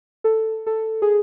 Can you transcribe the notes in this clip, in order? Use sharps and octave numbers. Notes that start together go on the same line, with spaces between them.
A4
A4
G#4